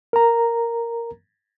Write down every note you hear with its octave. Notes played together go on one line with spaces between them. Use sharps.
A#4 A#5